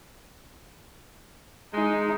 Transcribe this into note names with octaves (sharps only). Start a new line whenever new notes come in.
G#3 D#4